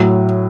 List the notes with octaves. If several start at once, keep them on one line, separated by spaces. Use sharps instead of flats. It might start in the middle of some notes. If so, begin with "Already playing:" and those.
Already playing: A2 F#3